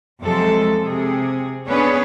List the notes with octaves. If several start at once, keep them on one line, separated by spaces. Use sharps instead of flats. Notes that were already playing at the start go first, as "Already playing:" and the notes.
F2 C3 F#3 G#3 A4
C3 G#4
B3 C#4 D4 G#4 B4 C#5